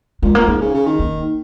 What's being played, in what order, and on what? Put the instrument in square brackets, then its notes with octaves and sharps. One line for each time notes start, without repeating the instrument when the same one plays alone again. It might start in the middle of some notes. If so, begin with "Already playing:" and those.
[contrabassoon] A#2 [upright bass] G#3
[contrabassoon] A#2 [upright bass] A#3
[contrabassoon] G#2 [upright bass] C#4
[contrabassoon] C#3
C#3
D#3
[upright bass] A#3